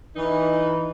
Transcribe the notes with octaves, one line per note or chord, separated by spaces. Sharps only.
E3 D#4